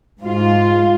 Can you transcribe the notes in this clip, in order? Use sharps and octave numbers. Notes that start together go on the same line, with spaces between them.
G#2 F4